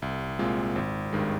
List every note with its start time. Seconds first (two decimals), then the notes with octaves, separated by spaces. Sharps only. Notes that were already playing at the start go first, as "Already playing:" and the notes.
0.02 C2
0.39 A#2 G#3 C4 F4
0.76 G#1
1.13 G2 D#3 G#3